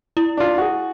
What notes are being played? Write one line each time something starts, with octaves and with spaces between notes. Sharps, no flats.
E4
D4 F4
F#4 G#4